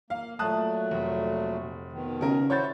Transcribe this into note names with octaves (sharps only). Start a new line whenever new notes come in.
A#3 F5
A#2 F#3 A3 A5 D#6 F#6
F1
B2 D#3
C#3 A#4
E4 F#4 C5 C#5 G6 A6